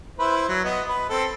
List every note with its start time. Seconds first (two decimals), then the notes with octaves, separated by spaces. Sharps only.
0.19 E4 B4 C5
0.48 F#3
0.65 B3 D#5
0.88 B4
1.10 C4 A4